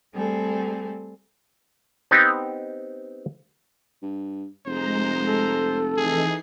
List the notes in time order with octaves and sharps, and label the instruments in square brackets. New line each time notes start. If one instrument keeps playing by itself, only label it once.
[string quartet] G3 A3 C4 G#4 A4
[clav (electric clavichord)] B3 C4 D#4 G4
[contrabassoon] G2
[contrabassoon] F1 [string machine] G#3 A#5 [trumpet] C5
[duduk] A4
[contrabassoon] F1 [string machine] E3 D#4 C7 [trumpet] G#4